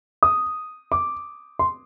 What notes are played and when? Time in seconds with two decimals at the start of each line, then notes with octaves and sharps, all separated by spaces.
0.23 D#6
0.92 D6
1.59 C6